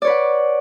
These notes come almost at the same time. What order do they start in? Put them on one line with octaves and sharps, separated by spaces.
D5 C#5 B4 F#5